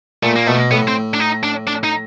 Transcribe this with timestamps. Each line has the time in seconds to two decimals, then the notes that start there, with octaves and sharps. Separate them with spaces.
0.23 A#2 A3
0.36 A#3
0.47 B2 A3
0.71 A2 B3
0.88 C4
1.14 D4
1.20 D#4
1.43 D4
1.67 D4
1.84 D#4